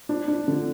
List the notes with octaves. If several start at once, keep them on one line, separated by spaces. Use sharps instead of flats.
D4
D4
D3